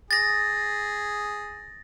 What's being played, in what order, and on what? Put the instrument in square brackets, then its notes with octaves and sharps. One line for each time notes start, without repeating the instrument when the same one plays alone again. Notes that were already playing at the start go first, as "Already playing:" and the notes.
[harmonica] G#4 [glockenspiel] A6 A#6